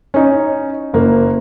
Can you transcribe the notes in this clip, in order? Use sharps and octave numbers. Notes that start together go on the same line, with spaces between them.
C#4 D#4
F#1 A#3